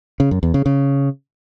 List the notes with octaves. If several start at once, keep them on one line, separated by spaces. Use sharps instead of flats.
C#3
F#2
E2
C#3
C#3